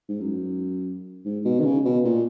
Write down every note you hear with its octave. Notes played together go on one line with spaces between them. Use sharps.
G#2
F#2
G#2
B2
D#3
C#3
B2
A#2